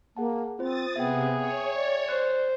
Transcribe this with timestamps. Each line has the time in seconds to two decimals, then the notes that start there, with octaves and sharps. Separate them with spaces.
0.17 A#3 G#4 F#5 A5
0.59 C4 F4 C5 D#6 A6
0.96 C3 B3 G#4 E5 G5
1.35 C#5
1.75 D5
2.09 C5 F#6